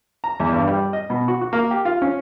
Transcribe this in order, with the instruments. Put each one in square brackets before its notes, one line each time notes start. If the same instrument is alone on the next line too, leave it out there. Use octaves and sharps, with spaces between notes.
[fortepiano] A#5
E2
G2
G3
D#5
B2
F#4
F#4
A#3
G4
F4
C#4